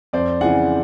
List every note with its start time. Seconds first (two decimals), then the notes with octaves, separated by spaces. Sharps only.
0.13 F2 C5 D5
0.41 C#3 E3 F#5 G#5